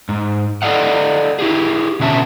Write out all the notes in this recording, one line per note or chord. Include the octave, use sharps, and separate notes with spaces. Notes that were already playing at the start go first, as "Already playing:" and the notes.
G#2
A4 D5 D#5 F5 F#5
E4 G4 G#4
B2 D3 C#4 E5 A5